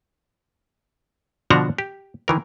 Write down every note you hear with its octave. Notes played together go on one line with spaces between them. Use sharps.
B2 D3 F3 D4 F#4 A#5
G4
D#3 E3 A#4